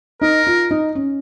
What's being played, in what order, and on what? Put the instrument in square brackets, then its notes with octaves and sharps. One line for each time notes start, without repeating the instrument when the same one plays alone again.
[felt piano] D#4 [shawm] A#4
[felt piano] F4
D#4
C#4